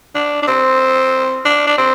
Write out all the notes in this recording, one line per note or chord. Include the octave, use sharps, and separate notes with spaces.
D4
D4
C4
D4
D4
C4